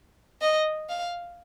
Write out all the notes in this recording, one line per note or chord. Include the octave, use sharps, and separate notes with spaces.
D#5
F5